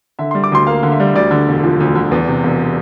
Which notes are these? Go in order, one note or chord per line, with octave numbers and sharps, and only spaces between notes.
D3 E5
C6
G3
D6
D2 C6
A#3 F5
D3
E5
G3
D2 D5
D3
E1
F3
D2
D3
E2
C3
E1